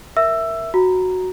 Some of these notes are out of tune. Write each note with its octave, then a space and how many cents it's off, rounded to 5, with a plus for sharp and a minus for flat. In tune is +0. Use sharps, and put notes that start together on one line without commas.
A#4 +0 E5 +0 E6 +15
F#4 +0 A#5 +0